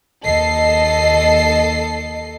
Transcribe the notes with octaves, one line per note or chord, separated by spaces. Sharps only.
D#2 A4 D#5 C7